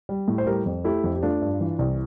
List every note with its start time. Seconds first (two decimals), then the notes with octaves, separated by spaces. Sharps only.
0.09 G3
0.28 A2
0.38 C5
0.46 G3 G4 A#4
0.66 F2
0.84 A3 E4 G4
1.04 F2
1.16 G4
1.23 A3 D4 F4
1.41 G2
1.60 E3
1.79 C2